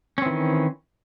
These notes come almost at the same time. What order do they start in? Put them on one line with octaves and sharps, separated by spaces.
C#4 C4 E3 D#3